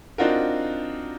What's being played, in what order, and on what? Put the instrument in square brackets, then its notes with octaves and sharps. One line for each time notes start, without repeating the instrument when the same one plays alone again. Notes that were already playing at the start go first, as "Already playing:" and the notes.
[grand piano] C4 D4 D#4 F4 F#4 A#4